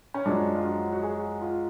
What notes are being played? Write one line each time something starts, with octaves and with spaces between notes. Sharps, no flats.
C#4
F#2 F3 G#3 D4
F4
F#4
F#4
G#4
F4